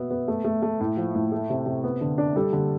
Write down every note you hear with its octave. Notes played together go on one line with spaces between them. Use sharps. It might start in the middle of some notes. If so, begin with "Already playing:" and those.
Already playing: B2 B3 E5
B3
A3
A3
A3
A2
F3
A2
A3
C3
C3
B3
D3
D4
G3 A4
D3